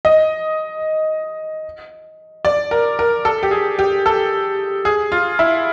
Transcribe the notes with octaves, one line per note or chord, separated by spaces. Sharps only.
D#5
D5
A#4
A#4
A4
G4
G#4
G4
A4
G#4
F4
E4